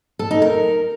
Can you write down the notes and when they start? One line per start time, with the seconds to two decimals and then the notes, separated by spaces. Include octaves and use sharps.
0.19 A4
0.31 D#4
0.42 A#4